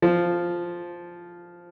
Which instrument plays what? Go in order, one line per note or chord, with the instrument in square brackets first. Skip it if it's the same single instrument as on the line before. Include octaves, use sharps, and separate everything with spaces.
[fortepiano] F3